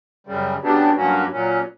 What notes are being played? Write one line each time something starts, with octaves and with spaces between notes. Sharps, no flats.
F#2 C#3 G3
C#3 F#3 B3 D4 G4
G2 F#3 A#3 C#4 F#4
A#2 F#3 C#4